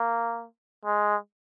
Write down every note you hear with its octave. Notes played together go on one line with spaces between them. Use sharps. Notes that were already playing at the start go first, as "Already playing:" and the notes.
Already playing: A#3
G#3